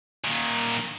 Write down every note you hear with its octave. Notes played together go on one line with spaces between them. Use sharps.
A#2 D#3